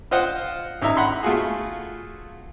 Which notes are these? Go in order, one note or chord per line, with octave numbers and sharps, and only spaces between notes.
F4 C5 D#5 F5 F#5
A1 D#4 E5 A#5
F#5 B5 C6
A3 F4 F#4 G#4